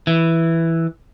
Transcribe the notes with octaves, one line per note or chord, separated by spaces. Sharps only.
E3